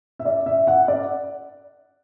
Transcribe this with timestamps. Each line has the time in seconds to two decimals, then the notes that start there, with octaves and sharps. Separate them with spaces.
0.19 E5
0.25 D5
0.46 E5
0.67 F#5
0.88 D5